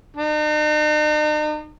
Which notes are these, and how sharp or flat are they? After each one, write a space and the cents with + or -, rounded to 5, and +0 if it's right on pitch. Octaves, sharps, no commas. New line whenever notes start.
D#4 -45